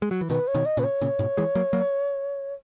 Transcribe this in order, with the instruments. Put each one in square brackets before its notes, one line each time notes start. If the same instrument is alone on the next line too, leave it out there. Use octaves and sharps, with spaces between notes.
[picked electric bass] G#3
F#3
E3
[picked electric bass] B2 D#3 [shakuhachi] B4
[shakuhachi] C#5
[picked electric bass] B2 D#3
[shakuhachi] D#5
[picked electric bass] A#2 C#3 [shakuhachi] B4
[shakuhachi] C#5
[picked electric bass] A#2 C#3
G#2 B2
E3 G#3
F#3 A#3
F#3 A#3